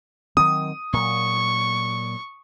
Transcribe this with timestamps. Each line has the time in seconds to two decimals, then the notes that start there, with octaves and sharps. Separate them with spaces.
0.37 D#3 F#3 C4 D#6
0.93 A#2 F#3 C#6